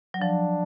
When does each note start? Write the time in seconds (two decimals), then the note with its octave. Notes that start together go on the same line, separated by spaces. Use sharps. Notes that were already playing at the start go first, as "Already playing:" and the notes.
0.14 F#3
0.21 F3 D4